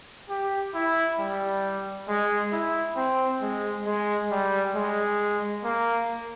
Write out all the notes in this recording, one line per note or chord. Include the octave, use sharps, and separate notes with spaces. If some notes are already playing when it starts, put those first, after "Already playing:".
G4
E4
G3
G#3
E4
C4
G#3
G#3
G3
G#3
A#3